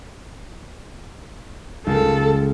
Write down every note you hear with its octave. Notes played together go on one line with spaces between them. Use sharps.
C#2 A4